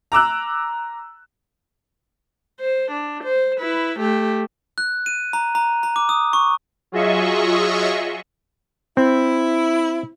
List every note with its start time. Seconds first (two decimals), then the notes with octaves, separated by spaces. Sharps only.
0.12 A#5 D6 E6 F#6
2.61 C5
2.91 D4
3.24 C5
3.60 E4 B4
3.99 A3 G4
4.78 F#6
5.06 D#7
5.33 A#5
5.55 A#5
5.83 A#5
5.96 D6
6.09 D#6
6.33 C#6
6.92 F#3 F4 G#4 D#5 E5 C#6
8.97 C4 E4